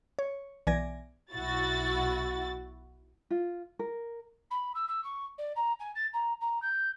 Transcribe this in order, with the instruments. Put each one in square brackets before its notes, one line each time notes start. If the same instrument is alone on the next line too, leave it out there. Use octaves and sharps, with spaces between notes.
[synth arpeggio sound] C#5
B1 E3 D5 G#5 G#6 A#6
[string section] B1 E4 F#4 A6
[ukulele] F4
A#4
[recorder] B5
E6
E6
C#6
D5
A#5
G#5
A6
A#5
A#5
G6